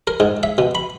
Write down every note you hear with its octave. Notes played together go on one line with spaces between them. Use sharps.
A#4
G#2
E5
B2
B5